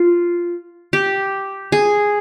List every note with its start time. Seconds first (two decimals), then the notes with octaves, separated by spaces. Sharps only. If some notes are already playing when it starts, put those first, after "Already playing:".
Already playing: F4
0.93 G4
1.72 G#4